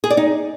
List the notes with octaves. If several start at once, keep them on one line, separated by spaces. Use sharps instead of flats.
G#4
D5
D#4